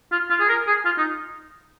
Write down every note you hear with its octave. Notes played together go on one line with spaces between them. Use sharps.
F4
F4
G#4
A#4
G#4
F4
D#4